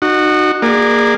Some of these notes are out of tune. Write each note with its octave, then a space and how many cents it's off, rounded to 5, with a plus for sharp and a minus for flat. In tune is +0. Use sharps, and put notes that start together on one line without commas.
D#4 -35 F#4 +0
A#3 +0 G#4 -20 D5 +20